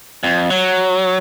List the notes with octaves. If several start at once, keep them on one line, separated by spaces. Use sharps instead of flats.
F2
F#3